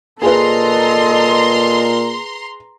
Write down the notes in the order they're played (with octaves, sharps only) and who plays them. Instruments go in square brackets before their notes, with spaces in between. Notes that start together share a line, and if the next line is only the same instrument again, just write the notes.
[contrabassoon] A#2 [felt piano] G#4 B4 [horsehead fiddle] A4 D#5 [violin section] A#5 C6